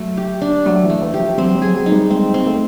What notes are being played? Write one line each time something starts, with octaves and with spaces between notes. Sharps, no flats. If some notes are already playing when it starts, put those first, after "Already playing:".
Already playing: F#3 A3
G4
D4
F#3 A3
E3
A3
E3
G4
F3
F#3 C4
F#3
G#4
F#3
D#4
G3
G#3 C4
C4
A3